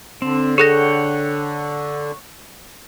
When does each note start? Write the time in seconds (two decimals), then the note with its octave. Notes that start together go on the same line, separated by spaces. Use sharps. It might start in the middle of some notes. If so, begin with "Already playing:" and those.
0.22 D3 C4
0.58 G#4 A4 C#5 F#5 G5 A#6